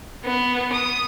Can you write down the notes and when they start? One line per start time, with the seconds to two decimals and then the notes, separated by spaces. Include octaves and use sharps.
0.24 B3
0.73 D#6